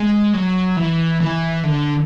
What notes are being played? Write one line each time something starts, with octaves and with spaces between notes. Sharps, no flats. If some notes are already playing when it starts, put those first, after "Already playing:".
Already playing: G#3
F#3
E3
E3
D3